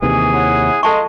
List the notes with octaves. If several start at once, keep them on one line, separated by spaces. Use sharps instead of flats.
D#2 C3 D#3 E3 G#4
E4 C#5 F#5
G#3 F4 A4 D#5 A5 C#6